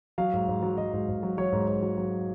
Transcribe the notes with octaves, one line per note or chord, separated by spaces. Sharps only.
F#3 F5
G#2
G#2
F#3
F#3 D#5
G#2
G#2
F#3
F#3 C#5
G#2
G#2
F#3
F#3